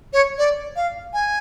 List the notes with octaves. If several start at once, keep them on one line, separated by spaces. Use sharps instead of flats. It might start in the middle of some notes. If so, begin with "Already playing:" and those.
C#5
D5
F5
G#5